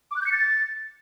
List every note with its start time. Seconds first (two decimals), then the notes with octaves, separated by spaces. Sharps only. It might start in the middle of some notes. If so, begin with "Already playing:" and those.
0.11 D6
0.16 F#6
0.21 G6
0.27 C#7
0.32 A6